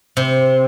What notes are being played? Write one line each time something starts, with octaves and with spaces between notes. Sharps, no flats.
C3